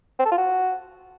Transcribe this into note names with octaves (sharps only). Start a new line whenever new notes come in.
C4
A4
F4
F#4